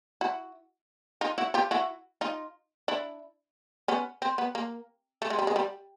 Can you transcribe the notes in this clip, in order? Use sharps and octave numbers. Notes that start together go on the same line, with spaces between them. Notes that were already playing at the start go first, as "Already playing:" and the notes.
E4 F#4
D#4 F4
E4 F#4
F4 G4
E4 F#4
D#4 F4
D4 E4
B3 C#4
C4
B3
A#3
A3
G#3
G3
G#3
G3